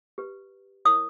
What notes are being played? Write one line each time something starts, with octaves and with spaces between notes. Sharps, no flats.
G4 B4
E4 A#4 C#5 D#6